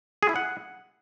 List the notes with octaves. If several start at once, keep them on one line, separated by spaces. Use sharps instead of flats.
G#4
E4
F#5